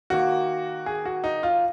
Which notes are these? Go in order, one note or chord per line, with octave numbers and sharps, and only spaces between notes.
D#3 A#3 F#4
G#4
F#4
D#4
F4